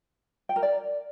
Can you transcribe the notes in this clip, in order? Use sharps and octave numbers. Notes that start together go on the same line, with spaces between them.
G5
A#4
D5